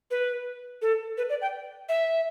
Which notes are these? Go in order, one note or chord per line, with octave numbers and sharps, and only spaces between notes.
B4
A4
B4
D5
G5
E5